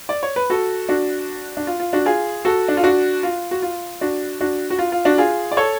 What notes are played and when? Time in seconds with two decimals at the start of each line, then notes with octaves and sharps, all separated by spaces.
0.09 D5
0.23 C#5
0.36 B4
0.50 F#4 A4
0.89 D4 F#4
1.57 D4
1.67 F4
1.80 F4
1.93 D4 F#4
2.06 F4 G#4
2.45 F#4 A4
2.68 D4
2.77 F4
2.83 D4 F#4
3.23 F4
3.51 F#4
3.62 F4
4.01 D4 F#4
4.41 D4 F#4
4.70 F#4
4.79 F4
4.92 F4
5.05 D4 F#4
5.18 F4 G#4
5.52 D5
5.57 A4 C#5